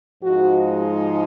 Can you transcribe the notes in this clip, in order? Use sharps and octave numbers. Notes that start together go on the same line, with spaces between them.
G#2 F3 G#3 D#4 F#4
F#4